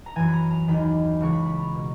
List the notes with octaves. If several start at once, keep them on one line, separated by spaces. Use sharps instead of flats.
A#5
F#2 E3 G#5
B5
A#5
A#5
D#2 D#3 B5
C#2 C#3 E3 C#6
B5
B5
A#5
B2